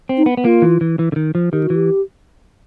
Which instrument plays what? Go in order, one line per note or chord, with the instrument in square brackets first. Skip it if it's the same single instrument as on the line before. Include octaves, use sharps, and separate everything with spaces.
[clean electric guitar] C4
[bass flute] D#4
[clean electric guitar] B3
B3
[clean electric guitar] A#3 [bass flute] F4
[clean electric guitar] E3
E3
E3
D3
D#3
F3
[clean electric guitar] D#3 [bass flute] G4
[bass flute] F#4
[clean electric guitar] E3
[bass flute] G4